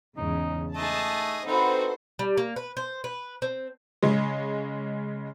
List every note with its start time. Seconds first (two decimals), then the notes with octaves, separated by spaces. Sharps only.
0.17 E2 G#2 C#3 D#4
0.76 A3 D#4 G#4 D#5 A5 D6
1.46 C4 D#4 E4 F#4 A4 B4 C5 F#5
2.19 G3
2.37 A#3
2.56 B4
2.77 C5
3.04 B4
3.42 C4
4.03 C#3 G#3